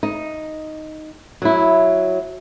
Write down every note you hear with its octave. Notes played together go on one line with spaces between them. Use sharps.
D#4
F#3 E4